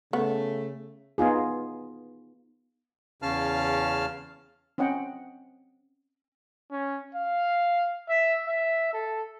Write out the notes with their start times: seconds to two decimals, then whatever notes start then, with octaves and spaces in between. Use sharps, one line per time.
0.13 C#3 A3 B3
1.18 B3 D#4 F4 G#4
3.22 E2 C#3 C#4 F5 A5 F6
4.78 C4 C#4 D#5 F#5 G5
6.72 C#4
7.15 F5
8.09 E5
8.48 E5
8.94 A4